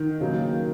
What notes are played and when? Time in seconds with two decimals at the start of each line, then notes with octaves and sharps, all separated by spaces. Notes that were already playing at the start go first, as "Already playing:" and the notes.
Already playing: D#3
0.20 C#3 F#3 A#3